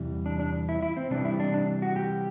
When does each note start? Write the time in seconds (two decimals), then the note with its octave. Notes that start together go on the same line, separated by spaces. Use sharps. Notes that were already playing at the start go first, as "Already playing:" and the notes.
Already playing: E2 C3 E3 G3
0.26 D4
0.40 D4
0.69 E4
0.82 E4
0.97 C4
1.11 C3 E3 G3 D4
1.25 E4
1.40 D4
1.54 D4
1.82 F#4
1.96 G4